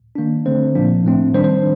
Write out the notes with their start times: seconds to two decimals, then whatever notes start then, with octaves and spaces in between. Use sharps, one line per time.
0.15 D#3 A#3 D4
0.46 D3 A3 C4 C5
0.75 A#2 F3 A#3 D4
1.05 A2 A3 C4
1.34 D#3 G3 D4 C5
1.44 C5